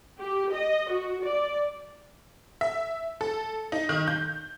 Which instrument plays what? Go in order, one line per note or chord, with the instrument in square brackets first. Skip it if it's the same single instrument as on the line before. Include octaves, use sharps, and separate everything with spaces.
[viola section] G4
D#5
F#4
D5
[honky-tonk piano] E5
A4
D#4
D#3
G6